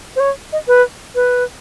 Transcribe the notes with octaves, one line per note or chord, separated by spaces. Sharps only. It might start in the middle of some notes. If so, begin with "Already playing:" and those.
C5
C#5
D#5
B4
B4